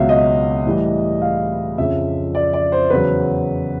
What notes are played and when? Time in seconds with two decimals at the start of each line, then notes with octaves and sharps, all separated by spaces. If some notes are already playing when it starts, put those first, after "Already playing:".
Already playing: C#2 B2 F#3 E5 F5
0.09 D#5
0.66 A2 E3 G3
1.22 F5
1.78 F2 C#3 F3 E5
2.35 D5
2.53 D5
2.72 C5
2.90 E2 C#3 F#3 B4